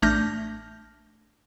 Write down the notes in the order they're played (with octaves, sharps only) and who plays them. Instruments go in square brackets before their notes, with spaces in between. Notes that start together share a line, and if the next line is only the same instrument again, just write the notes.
[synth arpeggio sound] A1 A3 D4 F6 G6 A#6